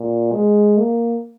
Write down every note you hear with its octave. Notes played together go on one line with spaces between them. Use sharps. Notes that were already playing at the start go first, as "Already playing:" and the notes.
Already playing: A#2
G#3
A#3